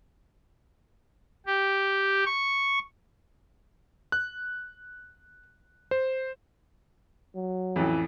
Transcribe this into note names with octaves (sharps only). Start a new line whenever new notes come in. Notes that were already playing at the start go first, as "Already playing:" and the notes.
G4
C#6
F#6
C5
F#3
A1 F2 E3